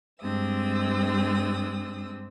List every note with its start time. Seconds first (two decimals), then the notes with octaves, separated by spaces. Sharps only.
0.21 G2 G#3 C4 D4 D#6 E6